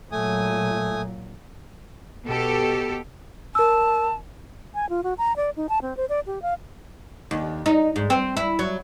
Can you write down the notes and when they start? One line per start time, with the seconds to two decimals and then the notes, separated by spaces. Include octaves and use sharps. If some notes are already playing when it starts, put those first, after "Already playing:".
0.12 A#2 F#3 A3 G#5 D#6
2.26 B2 G4 A4
3.55 A#4 A5 E6
4.75 G#5
4.89 F4
5.03 F#4
5.18 A#5
5.36 D5
5.56 D#4
5.69 A5
5.82 C4
5.97 C5
6.09 D5
6.26 G4
6.42 F5
7.31 D#2
7.66 D#4
7.96 G#2
8.10 C4
8.37 E4
8.59 F#3